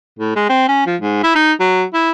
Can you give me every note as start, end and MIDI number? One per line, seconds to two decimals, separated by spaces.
0.19 0.33 45
0.36 0.46 56
0.50 0.66 60
0.68 0.85 61
0.87 0.96 53
1.01 1.20 44
1.24 1.32 64
1.35 1.53 63
1.60 1.83 54
1.94 2.12 64